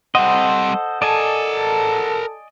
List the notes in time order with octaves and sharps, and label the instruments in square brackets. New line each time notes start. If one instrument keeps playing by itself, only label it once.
[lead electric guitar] G3 C4 [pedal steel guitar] A4 C5 D#5 [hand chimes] F#5
[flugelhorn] A4 [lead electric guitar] A#4 A5 [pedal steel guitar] D5 D#5 G#5